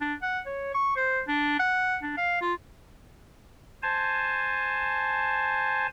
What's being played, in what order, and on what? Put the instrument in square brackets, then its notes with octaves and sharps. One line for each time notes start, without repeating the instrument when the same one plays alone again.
[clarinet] D4
F#5
C#5
C#6
C5
D4
F#5
D4
F5
F4
[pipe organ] C5 G#5 A5